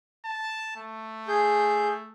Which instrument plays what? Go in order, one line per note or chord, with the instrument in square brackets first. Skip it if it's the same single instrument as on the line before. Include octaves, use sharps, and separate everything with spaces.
[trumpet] A5
A3
[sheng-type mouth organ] G#4 G6